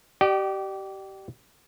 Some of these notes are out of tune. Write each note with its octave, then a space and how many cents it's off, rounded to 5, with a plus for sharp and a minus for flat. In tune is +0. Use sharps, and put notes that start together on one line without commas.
G4 -25 D5 +40 G5 -40